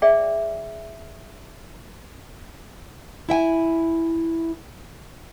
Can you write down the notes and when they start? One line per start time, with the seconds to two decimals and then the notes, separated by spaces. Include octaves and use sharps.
0.02 G#4 D5 E5 G5
3.29 E4 E5 G5 G#5